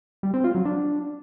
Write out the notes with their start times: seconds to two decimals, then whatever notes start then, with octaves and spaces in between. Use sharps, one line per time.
0.23 G3
0.34 C4
0.44 F4
0.55 F#3
0.65 D4